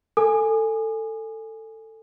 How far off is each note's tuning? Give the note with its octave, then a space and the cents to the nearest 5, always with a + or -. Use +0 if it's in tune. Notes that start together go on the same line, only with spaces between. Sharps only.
A4 +15 G#5 +0 D#6 -40